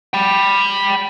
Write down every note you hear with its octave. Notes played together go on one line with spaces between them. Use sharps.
G5 B5